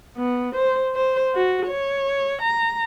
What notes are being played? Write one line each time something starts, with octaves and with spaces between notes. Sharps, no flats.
B3
C5
C5
F#4
C#5
A#5